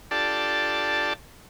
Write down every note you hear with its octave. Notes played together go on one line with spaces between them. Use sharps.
D4 F4 G4 A4 D5 A5